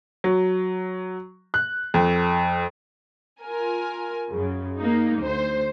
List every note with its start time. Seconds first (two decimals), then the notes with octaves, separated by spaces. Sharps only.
0.24 F#3
1.54 F#6
1.94 F2
3.42 F4 A#4 G#5
4.31 F#2 C#3
4.77 A#3 D#4
5.19 D2 C5